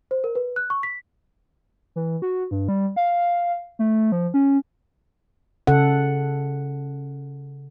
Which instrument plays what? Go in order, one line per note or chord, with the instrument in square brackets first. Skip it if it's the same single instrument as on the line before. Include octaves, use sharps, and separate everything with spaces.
[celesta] C5
A#4
B4
F#6
C#6
B6
[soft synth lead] E3
F#4
G2
G3
F5
A3
F3
C#4
[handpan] C#3 A4 F#5